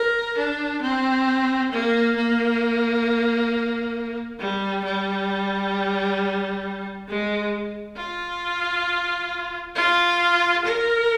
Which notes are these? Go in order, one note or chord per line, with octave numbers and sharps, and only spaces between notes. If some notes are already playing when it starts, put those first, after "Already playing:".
Already playing: A#4
D4
C4
A#3
A#3
G3
G3
G#3
F4
F4
A#4